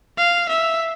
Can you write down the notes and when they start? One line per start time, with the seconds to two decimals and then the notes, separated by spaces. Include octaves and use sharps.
0.17 F5
0.49 E5